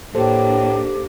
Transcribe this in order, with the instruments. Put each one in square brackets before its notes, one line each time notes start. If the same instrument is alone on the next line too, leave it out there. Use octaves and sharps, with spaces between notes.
[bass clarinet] A2 [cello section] A#3 D4 [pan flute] G4 [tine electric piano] A4 C5